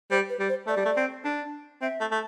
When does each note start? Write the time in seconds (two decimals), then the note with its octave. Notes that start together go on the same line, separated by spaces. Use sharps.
0.11 G3 C5
0.30 B4
0.40 G3
0.49 C5
0.67 A3 D5
0.77 G3
0.85 A3
0.97 C4
1.25 D4
1.82 C4 E5
2.01 A3
2.12 A3